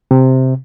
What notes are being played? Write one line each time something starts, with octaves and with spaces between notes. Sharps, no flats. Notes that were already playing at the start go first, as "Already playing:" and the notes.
C3